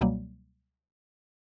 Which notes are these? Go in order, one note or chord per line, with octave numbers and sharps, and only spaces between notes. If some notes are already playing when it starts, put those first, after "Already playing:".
C#2 B2 F#3 G3 A#3